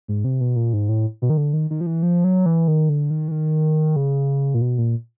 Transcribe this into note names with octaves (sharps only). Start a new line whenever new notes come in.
G#2
C3
B2
A#2
G#2
A2
B2
D#3
D3
D#3
D#3
F3
E3
F3
F#3
E3
D#3
D3
D#3
E3
D#3
C#3
A#2
B2
A#2